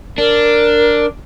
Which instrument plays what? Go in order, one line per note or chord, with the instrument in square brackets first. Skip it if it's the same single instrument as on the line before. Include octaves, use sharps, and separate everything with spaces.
[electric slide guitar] D4 [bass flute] A#4